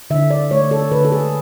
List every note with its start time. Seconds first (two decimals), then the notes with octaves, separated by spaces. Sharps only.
0.10 D3 E5
0.31 D5
0.51 A3 C#5
0.71 A4
0.92 D3 B4
1.05 A4
1.12 G#4